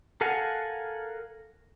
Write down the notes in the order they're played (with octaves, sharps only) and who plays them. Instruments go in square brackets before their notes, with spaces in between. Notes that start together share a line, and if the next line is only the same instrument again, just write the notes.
[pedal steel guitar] A4 A#4 F5 F#5 G#5